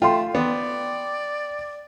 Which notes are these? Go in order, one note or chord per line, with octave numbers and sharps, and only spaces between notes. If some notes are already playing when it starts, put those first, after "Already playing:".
A3 F4 G5 C6
B3 D5